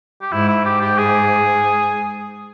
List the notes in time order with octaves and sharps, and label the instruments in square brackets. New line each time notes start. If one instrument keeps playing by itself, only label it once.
[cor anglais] G4
[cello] G#2 [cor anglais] E4
[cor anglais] E4
G4
G4
G#4